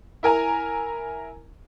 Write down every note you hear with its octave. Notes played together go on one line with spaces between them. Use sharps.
E4 A#4 G#5 A#5